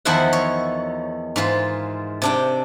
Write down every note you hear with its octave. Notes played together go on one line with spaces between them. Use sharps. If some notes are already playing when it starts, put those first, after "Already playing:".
E2 D#3 F3 E4 C5 F#5
C#5
G#2 E3 F4
C3 D4 G5